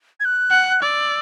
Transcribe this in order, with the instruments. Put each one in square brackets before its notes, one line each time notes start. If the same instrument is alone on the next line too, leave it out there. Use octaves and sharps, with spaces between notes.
[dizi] G#6
F#6
[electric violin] F#5
[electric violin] D5 [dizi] E6